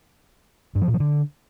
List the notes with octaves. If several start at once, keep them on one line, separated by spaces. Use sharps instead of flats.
G2
F3
A#2
F3
D3